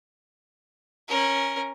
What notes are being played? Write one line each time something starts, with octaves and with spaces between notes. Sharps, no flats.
C#4 A#4